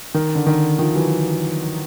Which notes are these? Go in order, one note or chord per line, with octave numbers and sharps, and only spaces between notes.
D#3
D3
D#3
D#3 F3
E3 F#3